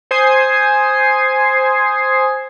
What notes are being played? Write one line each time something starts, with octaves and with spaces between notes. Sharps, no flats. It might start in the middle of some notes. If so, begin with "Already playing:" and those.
C5 G#5 D#6 G#6 C7